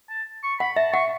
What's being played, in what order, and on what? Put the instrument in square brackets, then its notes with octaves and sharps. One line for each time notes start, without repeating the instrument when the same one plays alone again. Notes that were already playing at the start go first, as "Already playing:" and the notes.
[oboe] A5
C#6
[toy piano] F#5 [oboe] B5
[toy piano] E5 [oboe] A5
[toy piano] F#5 [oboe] C#6